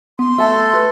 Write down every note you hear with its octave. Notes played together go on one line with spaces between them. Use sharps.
B3 C6
A3 A4 E5 A5 E6
B4